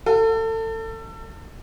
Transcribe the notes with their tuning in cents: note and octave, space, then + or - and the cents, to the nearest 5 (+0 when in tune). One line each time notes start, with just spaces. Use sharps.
A4 +30